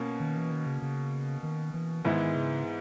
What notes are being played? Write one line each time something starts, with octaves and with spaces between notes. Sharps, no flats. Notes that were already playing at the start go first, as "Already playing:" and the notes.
Already playing: B2 A#3 C#4
D#3
E3
D#3
C#3
C#3
D#3
E3
G#2 D#3 E3 G#3 B3 E4
C#3